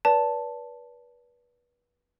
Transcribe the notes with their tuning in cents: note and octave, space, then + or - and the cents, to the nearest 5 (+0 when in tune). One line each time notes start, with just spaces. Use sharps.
B4 -30 D5 -40 A5 +0